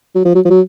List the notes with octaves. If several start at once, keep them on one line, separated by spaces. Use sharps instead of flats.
F#3
F3
F#3
F3
F#3